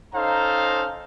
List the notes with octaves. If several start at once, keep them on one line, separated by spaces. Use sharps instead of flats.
C#4 D#4 A4 C5 F5 A#5